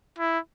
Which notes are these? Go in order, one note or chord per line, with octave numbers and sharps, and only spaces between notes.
E4